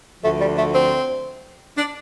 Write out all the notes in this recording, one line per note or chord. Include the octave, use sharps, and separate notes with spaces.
D2 D3 F3 A3
G3
A3
C4
D4